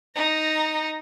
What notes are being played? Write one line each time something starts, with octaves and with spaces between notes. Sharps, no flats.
D#4 A#6